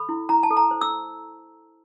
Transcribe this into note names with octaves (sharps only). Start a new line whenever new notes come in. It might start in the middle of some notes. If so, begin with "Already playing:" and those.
Already playing: A4 B5
E4
E4 A#5
A5
A4
A#5
C5
E6